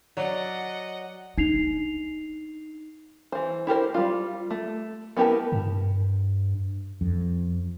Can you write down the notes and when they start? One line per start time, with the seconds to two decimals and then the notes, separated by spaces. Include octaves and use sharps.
0.17 F#3 D5 D#5 F#5
1.38 D4 D#4 C7 F7
3.32 E3 C5
3.67 E4 G4 A#4 C5
3.94 G3 F4
4.51 A3
5.17 B3 E4 G4 A#4 A5
5.52 G2
7.01 F2